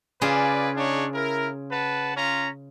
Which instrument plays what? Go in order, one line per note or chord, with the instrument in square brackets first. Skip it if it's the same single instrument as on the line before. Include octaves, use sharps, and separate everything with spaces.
[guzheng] C#3 F4 G#4 [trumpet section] B4 D5
[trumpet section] D4 D#4 C#5
E4 A#4
B4 F#5 A5
C#4 F4 A#5